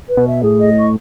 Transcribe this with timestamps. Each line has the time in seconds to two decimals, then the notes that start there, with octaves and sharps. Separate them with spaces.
0.09 B4
0.17 B2
0.26 E5
0.43 A2 G#4
0.60 D#5
0.77 C#6